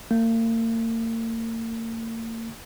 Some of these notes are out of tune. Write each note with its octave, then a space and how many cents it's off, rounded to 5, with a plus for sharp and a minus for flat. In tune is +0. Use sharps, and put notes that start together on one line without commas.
A#3 -40